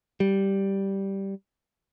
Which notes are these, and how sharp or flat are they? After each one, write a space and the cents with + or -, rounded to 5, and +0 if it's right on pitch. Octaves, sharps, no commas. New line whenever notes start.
G3 -5